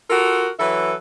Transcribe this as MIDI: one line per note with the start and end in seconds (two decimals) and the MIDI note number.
0.10 0.49 65
0.10 0.49 66
0.10 0.49 69
0.10 0.49 70
0.60 0.94 52
0.60 0.94 54
0.60 0.94 69
0.60 0.94 71
0.60 0.94 76